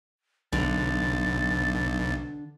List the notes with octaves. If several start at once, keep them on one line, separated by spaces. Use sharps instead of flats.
B1 D3 A6